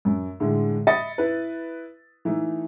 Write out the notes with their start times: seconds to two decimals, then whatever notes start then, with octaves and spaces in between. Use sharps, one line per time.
0.05 F#2
0.40 A2 D3 G#3
0.87 D#5 E5 B5 A6 C#7
1.18 E4 B4
2.25 E3 A3 D#4